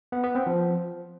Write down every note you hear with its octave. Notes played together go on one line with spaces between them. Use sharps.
B3
B3
C4
F3